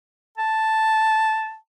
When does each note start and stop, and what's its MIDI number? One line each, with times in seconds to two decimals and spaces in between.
0.38 1.55 81